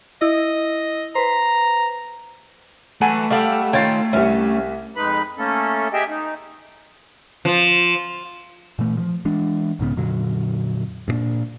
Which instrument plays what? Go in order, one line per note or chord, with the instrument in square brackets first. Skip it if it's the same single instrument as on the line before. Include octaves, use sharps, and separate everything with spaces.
[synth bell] E4 [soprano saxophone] D#5
[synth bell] B4 C5 [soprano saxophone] A#5
[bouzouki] E3 F#3 [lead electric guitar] A3 [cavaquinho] F#5 G#5 A5
[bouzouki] G3 F5 F#5 [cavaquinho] G4 A4 C#6
[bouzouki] D#3 C#4 F4 [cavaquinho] G5 [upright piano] G#6 A6 C7
[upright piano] C2 G3 E5 [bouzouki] C#4
[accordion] F2 G#3 D#4 B4 B5
A3 A#3 C#4 A4
G4 G#4 D#5 E5 G5
D#4
[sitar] F3
[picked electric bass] A#2 E3 A3
F3
E3 G#3 D4
B1 G#2 C#3 B3
F2 A#2 D3 F#3
G2 A#2 A#3 D4